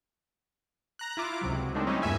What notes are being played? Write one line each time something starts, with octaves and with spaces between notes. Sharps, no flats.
A#5 F#6
E4 F4 D6
C#2 C3 F#3
D#3 G#3 A3 C4 D4
G3 C4 C#4 D#4 E4
E2 G2 A#2 E5 G#5